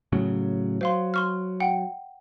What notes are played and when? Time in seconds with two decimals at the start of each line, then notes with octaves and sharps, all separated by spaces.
0.12 A2 C#3 F#3
0.81 F#3 C5 F5 C6
1.14 C6 C#6 F6
1.60 F#5 G5